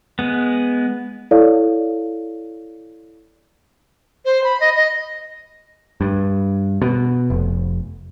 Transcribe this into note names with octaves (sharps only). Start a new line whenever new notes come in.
G#3 B3
E4 A4 C#5 D5 F5
C5
B5
D#5
D#5
G2
B2
F1